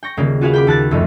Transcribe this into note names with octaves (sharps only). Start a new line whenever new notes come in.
G5 C#6 A#6
D#1 C#3 A#3 C#4
F4 F#4 G#4 B4 F5
G5 B5 D6
D#2 A5 F#6 A6
F#1 C2 F2 A3 D#7